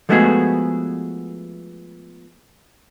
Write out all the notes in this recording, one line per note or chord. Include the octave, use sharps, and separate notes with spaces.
F3 G#3 A3 B3 F#4 G#4